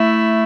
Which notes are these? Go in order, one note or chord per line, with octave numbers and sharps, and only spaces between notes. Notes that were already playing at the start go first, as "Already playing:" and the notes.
Already playing: A3 E4